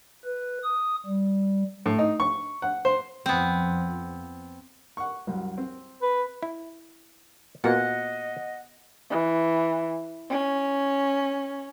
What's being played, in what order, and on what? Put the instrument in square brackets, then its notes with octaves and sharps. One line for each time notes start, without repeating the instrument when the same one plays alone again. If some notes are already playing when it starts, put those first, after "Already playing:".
[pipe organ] B4
D#6
G3
[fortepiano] A2
D#4
C#6
F#5
C5
[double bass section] F2 F3 [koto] B3 C4
[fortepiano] F#5 C#6
C2 F#2
C4
[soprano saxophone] B4
[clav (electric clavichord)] E4
[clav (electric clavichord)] A#2 A#3 [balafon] B3 F#4 B4 [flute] D#5 [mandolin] F#5
[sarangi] E3
C#4